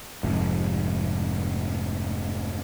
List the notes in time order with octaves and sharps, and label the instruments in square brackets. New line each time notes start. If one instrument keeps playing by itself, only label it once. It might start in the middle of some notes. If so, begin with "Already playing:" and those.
[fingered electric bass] F1 G#2